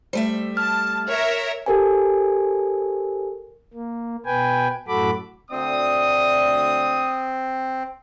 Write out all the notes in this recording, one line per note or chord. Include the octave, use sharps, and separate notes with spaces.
G3 A3 C5 E5
A5 F6
A#4 C#5 E5
G4 A4 A#4 C5 G#5
A#3
B2 B4 G5 G#5
F#2 A2 F#4 A4 B5 D6
D2 C4 D5 D#6